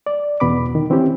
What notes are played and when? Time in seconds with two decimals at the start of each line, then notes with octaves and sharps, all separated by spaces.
0.07 D5
0.40 E2 B2 B3 B5 D6
0.75 D#3
0.90 E3 C4 C#4 E4 G4